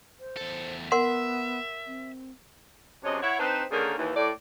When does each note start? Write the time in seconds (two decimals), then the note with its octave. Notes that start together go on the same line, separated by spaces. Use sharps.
0.20 C5
0.37 E2 A4
0.92 B3 A#4 E5 F#5 C6
1.87 C4
3.04 F#2 C3 D4 G#4 C#5 D#5
3.22 E4 C#5 F#5
3.39 C4 D4 D#4 B4 C5
3.71 D3 D#3 A#3 C#4 G#4 A#4
3.98 D#2 E3
4.15 A2 D5